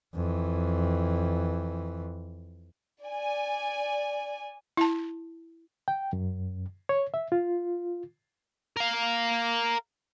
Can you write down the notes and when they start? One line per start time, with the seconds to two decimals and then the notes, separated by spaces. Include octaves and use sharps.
0.15 F2 E3
3.02 D5 G#5
4.77 E4 A5
5.88 G5
6.13 F#2
6.89 C#5
7.14 E5
7.32 F4
8.77 A#4 F5